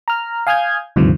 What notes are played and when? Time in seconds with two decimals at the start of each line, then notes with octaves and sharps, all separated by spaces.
0.08 A#5 F6
0.47 F5 G#5 D#6 F6 G6 G#6
0.96 D2 G2 C3 D#3 F3